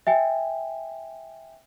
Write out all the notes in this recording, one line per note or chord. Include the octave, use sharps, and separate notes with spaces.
E5 G5 G#5